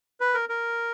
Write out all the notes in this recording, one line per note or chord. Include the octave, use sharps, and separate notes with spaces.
B4
A#4
A#4